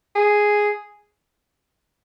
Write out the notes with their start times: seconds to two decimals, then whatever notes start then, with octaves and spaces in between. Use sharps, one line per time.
0.15 G#4